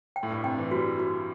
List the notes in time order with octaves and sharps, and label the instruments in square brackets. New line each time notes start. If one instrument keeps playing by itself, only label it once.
[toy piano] G5
[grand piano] A2
G2
[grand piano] C3 [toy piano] G5
[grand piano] E3
[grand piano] G3 [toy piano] F#4
[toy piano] F#4